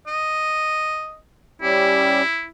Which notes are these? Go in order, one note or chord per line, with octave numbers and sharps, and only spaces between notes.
D#5
G3 C#4 E4 G4